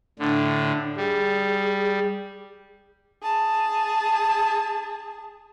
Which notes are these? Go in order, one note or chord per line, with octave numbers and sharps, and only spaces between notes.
A2 D3 D4
G3 G#4
G#4 A5